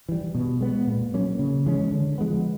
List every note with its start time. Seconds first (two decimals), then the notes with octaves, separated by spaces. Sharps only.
0.09 E3 G3
0.35 B2
0.61 G#3 B3
0.87 A#2
1.14 F#3 A#3 C#4
1.39 C#3
1.66 E3 G#3 C#4
1.92 D3
2.18 F3 G#3 B3